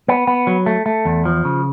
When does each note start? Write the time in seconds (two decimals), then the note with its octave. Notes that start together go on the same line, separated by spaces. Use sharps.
0.08 B3
0.27 B3
0.47 F#3
0.66 A3
0.86 A3
1.05 E2
1.25 F3
1.45 C#3